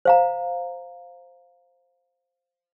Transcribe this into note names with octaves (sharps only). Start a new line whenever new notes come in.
C5 F5 A#5